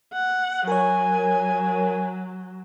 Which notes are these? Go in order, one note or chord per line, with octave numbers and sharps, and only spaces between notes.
F#5
F#3 A#4 C#5 G#5